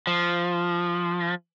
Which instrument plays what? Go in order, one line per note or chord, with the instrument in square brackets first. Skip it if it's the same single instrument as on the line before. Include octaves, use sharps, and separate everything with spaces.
[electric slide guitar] F3